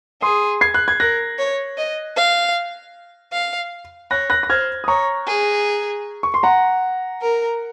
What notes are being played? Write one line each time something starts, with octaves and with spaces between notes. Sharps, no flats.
G#4 C6 D#6
G#6 C7
F#6
G#6
A#4 F#6 A#6
C#5
D#5
F5
F5
C#5 F#6 A#6
F#6 A#6
A#6
C5 F6 G#6
D#6
C#5 A#5 C#6
G#4
C#6
C6
F#5 A#5
A#4